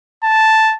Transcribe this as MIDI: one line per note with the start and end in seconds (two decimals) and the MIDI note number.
0.24 0.75 81